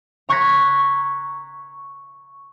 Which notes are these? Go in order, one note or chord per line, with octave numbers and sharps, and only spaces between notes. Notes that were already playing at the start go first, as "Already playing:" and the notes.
A#5 C#6 F#6 G#6 A#6 B6